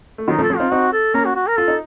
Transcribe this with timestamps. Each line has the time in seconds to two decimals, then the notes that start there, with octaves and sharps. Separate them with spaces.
0.18 A3
0.28 D#3 F#3 D#4
0.38 F3 A3
0.43 A4
0.50 F3 A3
0.57 C4 D#4 F4
0.72 C4 D#4 F#4
0.93 A4
1.14 A#3 C#4 A#4
1.25 F#4
1.35 F#4
1.47 A#4
1.57 F4 A4
1.68 D#4